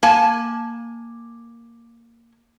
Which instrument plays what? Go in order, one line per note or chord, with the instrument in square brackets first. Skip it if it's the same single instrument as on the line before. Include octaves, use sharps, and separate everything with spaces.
[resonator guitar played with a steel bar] A#3 G#5 A5